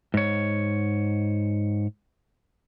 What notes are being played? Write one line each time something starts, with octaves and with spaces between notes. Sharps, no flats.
G#2 C#5